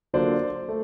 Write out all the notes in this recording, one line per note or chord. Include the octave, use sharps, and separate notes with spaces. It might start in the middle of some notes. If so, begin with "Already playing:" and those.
D3 F#3 A#3 D4 F4 C5 D5
A3